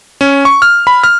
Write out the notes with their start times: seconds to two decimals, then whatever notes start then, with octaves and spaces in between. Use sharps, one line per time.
0.21 C#4
0.45 C#6
0.62 F6
0.87 B5
1.04 F6